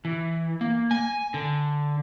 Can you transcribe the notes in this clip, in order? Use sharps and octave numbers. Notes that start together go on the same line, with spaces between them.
E3
A#3
G#5
D3